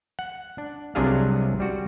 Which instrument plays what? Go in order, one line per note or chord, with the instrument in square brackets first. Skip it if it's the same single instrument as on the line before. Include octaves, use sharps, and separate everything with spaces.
[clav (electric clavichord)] F#5
D4
C2 C3 F#3 D4 G#4 F5
G3 F#4